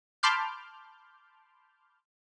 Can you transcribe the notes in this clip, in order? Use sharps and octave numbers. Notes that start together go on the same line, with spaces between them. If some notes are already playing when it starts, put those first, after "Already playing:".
A5 B5 C6 D6 F6 G6